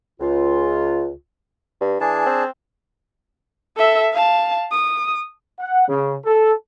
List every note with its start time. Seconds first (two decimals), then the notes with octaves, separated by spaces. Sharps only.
0.20 C#2 F4
1.81 G2
2.01 E3 D4 G#4 A5
2.26 C4
3.77 A4 E5
4.13 F5 A5
4.71 D#6
5.60 F#5
5.88 C#3
6.25 A4